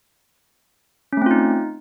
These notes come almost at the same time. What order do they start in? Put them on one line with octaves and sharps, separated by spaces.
C#4 A3 C4 F4 D#4